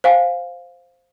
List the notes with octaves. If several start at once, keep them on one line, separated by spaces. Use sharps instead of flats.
C5 F5 G#5